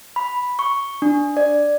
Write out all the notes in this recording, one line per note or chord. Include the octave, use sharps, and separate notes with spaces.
B5
C#6
D4
D5